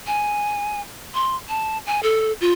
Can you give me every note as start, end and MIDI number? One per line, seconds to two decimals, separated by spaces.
0.07 0.81 80
1.15 1.36 84
1.49 1.78 81
1.86 2.01 80
2.03 2.32 69
2.41 2.52 65